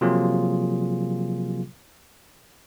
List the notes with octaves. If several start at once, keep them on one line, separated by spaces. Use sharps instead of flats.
C3 F3 F#3 A#3 F4 G#4